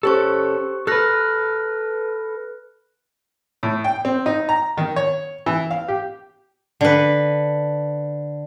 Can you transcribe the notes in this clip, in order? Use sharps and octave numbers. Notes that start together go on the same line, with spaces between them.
C#4 G4 A4 C5 C#6
A4 B4 F6 F#6 A#6
A2
G5
C4
D#4
A#5
D#3
C#5
E3
F5
G4
D3 B4